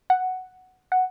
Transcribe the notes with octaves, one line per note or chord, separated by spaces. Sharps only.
F#5
F#5